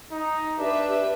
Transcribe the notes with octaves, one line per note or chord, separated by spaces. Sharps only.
D#4
D4 G4 B4 E5